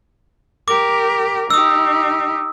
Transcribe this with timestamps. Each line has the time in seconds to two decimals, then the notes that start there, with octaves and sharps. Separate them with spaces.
0.68 G4 A#4 D6
1.50 D#4 G4 D#6 E6